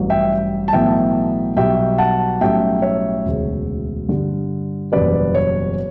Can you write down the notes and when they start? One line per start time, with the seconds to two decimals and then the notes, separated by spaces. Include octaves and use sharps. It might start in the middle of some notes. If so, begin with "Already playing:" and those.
Already playing: A1 G2 F#3
0.10 E5 G5
0.68 A5
0.73 B1 A2 E3 B3 E5 G5
1.56 B1 B2 G3 E5 G5
1.98 F#5 A5
2.41 B1 A2 G3 C#4 E5 G5
2.82 C#5 E5
3.25 E1 D2 C#3
4.09 G2 D3 G3
4.92 F#1 E2 B2 G3 C#4 B4 D5
5.35 C#5